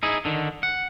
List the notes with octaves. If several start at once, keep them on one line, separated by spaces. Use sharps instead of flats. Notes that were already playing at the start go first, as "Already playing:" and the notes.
D#4 E4 G#4
D3 D#3
F#5